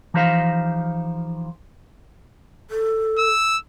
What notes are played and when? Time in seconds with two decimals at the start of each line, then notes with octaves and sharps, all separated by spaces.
0.14 E3 F3 D#4 G4 C5 F5
2.70 A4
3.18 E6